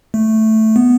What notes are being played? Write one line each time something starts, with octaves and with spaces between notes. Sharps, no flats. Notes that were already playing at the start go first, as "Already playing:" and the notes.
A3
B3